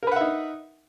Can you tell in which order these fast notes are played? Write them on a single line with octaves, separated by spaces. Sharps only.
A#4 B4 F#5 E5 D#4